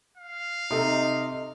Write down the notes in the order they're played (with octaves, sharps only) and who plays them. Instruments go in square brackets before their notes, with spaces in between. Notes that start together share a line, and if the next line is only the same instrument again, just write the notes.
[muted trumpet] F5
[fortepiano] C3 A4 [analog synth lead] D#4